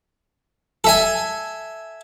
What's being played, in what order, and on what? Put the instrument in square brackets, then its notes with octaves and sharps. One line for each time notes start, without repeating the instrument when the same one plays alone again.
[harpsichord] A4 E5 G#5